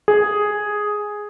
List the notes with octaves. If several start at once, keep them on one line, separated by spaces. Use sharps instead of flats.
G#4